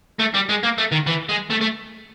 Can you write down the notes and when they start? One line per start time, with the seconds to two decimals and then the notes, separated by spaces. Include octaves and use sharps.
0.19 A3
0.34 G3
0.49 G#3
0.63 A#3
0.78 A3
0.92 D#3
1.07 E3
1.29 G#3
1.50 A3
1.61 A3